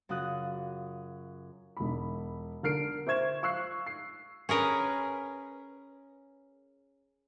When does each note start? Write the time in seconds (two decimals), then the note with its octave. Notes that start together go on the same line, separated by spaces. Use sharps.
0.09 F#2 C#3 F4 F#4 D#6 F#6
1.77 E1 B5
2.63 D3 A#4 F6 C7 D7
3.07 C5 E5 C#6 G#6 E7
3.42 F5 C#6 E6 F#6 C7
3.87 C7
4.49 C#4 G#4 A#4 B4